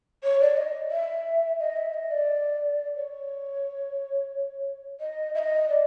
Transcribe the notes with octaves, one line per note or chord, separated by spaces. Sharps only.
C#5
D5
D#5
E5
D#5
E5
D#5
D5
C#5
D#5
E5
D#5
D5